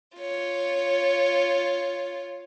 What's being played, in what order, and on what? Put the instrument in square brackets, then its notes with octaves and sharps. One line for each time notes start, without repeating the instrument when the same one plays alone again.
[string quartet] F4 C#5